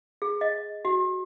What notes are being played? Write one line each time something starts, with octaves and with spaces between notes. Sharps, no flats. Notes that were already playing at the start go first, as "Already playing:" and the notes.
G#4
D#5
F#4